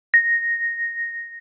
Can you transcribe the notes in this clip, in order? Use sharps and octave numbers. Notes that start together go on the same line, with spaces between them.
A#6